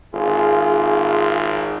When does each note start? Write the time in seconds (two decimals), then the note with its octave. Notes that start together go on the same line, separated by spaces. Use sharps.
0.14 G#1 F4 G#4